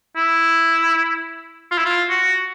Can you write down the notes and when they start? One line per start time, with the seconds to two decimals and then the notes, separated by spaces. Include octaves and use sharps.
0.16 E4
1.71 F4
1.78 E4
1.86 F4
2.09 F#4